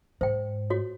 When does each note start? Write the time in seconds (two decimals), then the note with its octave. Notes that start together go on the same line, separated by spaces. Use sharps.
0.21 G#2 C5 G5
0.70 F#4 C#5